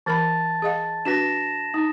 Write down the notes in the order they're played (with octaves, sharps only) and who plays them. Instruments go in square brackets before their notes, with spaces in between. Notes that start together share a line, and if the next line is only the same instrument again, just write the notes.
[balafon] E3 A#4 B5 [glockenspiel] A5 A6
[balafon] G#4 D#5 F5
[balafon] D4 F#4 B4 [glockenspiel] A#6 B6 E7
[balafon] D#4 [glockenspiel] D#6